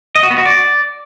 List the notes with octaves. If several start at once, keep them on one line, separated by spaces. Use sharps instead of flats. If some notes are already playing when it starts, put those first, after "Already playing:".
D#5
F#4
B3
F#4
D5